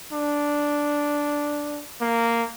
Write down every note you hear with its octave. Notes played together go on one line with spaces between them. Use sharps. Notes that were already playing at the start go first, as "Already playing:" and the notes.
D4
A#3